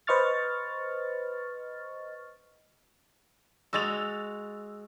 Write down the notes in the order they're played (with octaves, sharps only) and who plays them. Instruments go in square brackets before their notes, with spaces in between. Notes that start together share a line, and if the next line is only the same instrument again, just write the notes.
[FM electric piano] B4 C5 D#5 C#6 F6 A6
[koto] G#3 F#4 [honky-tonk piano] E6 A6 F7